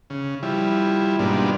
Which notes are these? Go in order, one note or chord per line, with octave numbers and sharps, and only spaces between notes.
C#3
F3 G3 E4
G#2 B2 F3 G3 A#3 D4